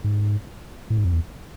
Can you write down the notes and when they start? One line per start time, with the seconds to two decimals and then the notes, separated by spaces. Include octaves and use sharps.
0.04 G#2
0.90 A2
0.97 G#2
1.04 F2
1.12 E2